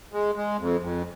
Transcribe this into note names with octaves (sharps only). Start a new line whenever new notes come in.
G#3
G#3
F2
F2